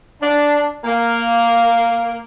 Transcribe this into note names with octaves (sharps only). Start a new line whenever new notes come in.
D4
A#3